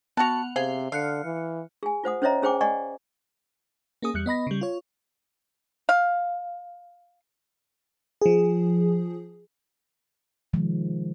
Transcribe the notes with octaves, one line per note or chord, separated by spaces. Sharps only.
B3 F#4 F#5 A5 F7
C3 G#4 C5 F5
D3 F5 F6 F#6 C#7
E3
G#4 G#5
F4 C5 F#5 D#6
C#4 C5 C#5 D#5 E5 A#5
C#4 G#4 C5 G5 G#5 D6
D5 D#5 F#5 G#5 C#6
A#3 C#4 G#4 D#6
E2 G3 F#6 C#7
B3 D#5 B5 A#6
C#3 G3
F4 C#5
F5
F3 G#4
C3 D#3 F3 G#3